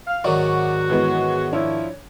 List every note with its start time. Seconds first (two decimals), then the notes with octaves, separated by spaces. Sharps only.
0.06 F5
0.24 G#2 D#3 F#3 F#4 D5 C#6
0.90 E3 G#3 B3
1.53 F3 D4 E4 C#5